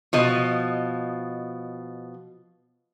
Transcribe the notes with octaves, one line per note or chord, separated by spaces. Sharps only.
B2 F3 D#5